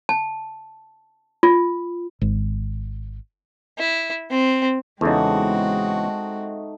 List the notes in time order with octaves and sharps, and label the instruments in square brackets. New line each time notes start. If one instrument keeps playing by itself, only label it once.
[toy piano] A5
F4
[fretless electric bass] G#1
[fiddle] E4
C4
[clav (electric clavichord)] E2 C#3 [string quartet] G#3 C4 F#4 [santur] A3 D#4